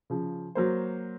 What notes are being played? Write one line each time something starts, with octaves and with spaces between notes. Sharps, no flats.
C#3 F3
F#3 A#3 C5